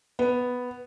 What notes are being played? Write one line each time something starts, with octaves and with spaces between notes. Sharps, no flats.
B3